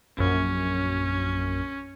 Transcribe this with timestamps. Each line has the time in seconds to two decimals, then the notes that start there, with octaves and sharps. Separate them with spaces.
0.18 A#1 F#2 C#4